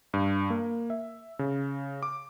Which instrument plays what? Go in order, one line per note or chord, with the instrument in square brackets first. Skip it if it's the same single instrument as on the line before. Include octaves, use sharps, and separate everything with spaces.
[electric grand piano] G2
A#3
E5
C#3
D6